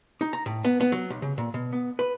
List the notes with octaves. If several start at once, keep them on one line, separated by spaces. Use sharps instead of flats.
D#4
A#5
A2
B3
B3
F#3
B1
C#3
A#2
B2
B3
B4